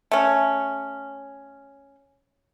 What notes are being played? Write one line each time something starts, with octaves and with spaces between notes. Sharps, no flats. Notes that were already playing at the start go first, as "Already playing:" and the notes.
A3 C#4